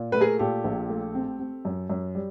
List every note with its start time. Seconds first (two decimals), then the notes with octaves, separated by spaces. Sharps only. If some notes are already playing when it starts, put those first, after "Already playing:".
Already playing: A#2
0.12 A3 B4
0.20 G#4 A#4
0.39 A#2 G4 A4
0.64 A#1
0.90 A3
1.15 C4
1.39 C4
1.65 F#2
1.90 F#2
2.15 G3